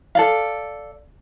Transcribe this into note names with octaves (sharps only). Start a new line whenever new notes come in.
A4 D5 F5